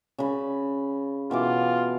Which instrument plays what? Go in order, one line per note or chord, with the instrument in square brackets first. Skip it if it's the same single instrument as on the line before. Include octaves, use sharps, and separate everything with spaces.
[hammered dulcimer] C#3 B5
[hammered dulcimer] B2 E3 D6 [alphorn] F4